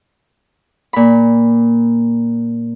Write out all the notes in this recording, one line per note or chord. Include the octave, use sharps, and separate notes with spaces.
A#2 B5